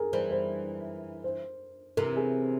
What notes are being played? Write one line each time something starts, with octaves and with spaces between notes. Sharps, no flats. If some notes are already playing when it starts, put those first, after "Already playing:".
Already playing: G#4 A#4
E3 G3 C5
C5
C5
C3 E3 A#4
G#4